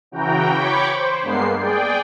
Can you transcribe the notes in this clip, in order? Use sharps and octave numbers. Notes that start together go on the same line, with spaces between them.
C#3 E3 F#4 G5 A#5
C#5 G5 B5 C#6 D6
C5
G2 G#3 A#3 B3 C7
G#4 D5 G5